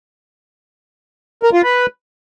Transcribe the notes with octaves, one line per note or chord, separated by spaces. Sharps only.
A#4
F4
B4